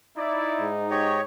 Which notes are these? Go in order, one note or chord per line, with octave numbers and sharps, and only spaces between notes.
D#4 E4 D5
G#2
G4 C#5 D#5